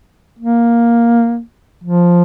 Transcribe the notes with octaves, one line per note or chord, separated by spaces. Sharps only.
A#3
F3